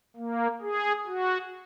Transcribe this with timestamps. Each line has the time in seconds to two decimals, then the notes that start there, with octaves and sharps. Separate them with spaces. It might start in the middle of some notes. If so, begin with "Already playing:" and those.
0.16 A#3
0.61 G#4
1.06 F#4